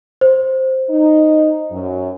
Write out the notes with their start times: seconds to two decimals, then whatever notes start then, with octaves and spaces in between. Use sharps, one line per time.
0.21 C5
0.90 D#4
1.72 F#2